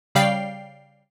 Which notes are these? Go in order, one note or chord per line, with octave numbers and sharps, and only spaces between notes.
C#3 G3 D5 F5 G5 C7